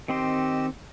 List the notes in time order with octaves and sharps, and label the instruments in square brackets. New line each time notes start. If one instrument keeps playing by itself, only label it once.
[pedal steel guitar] D#3 C4 C6 [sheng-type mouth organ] G4 D#5 E6